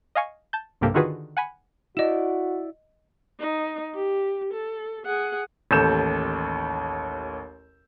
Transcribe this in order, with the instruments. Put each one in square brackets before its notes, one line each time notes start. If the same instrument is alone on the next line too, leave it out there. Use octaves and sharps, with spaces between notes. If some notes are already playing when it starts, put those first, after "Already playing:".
[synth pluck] D#5 F5 G#5 C#6
A5 G6
B1 G2 C3 A#3 G4 A4
D3 D#3 F4 F#4 G#4 B4
F#5 G#5 B5
[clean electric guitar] E4 D5 [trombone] F#4 [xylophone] D#5 E7
[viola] D#4
G4
A4
G#4 F#5
[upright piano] A1 D#2 A4 G6 E7